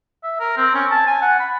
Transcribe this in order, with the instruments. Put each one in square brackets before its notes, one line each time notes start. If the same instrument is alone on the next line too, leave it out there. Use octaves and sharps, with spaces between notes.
[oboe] E5
A#4
C4
C#4
A5
G#5
F#5
B5